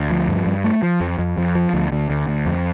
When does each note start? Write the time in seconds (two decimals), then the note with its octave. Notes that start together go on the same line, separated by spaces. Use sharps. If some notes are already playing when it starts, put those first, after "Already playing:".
Already playing: D2
0.11 F3
0.28 G2
0.46 G2
0.64 A3
0.82 F3
1.01 F2
1.19 F2
1.38 F2
1.55 F3
1.74 D2
1.92 D2
2.10 D2
2.28 D2
2.46 F2